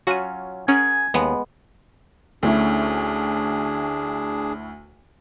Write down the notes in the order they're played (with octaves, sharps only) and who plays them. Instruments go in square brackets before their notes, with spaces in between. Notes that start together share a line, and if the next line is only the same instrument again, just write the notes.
[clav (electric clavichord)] F#3 C#4 F4 [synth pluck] F#4 D#7
[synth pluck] C#4 [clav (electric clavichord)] G#4 A#4 F#5 [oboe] G#5
[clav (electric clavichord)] D#2 [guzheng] G#3 B3
[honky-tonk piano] D2 [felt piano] A3 C#4 E4 [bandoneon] D4 G#4